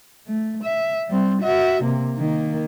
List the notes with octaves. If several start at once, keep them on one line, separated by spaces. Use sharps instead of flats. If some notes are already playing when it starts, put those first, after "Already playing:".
A3
E5
G3 C4
F#4 E5
C3 A#3
D#3 A#3